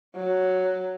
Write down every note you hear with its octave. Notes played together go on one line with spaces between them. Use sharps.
F#3